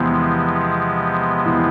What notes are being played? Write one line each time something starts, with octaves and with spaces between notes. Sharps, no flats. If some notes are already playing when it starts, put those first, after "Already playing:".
Already playing: E2 C3 E3 F3 G#3 B3
E2 E3